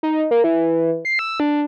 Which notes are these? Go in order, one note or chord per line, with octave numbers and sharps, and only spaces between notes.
D#4
A#3
E3
C7
E6
D4